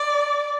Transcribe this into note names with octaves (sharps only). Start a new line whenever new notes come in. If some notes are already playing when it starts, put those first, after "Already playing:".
Already playing: D5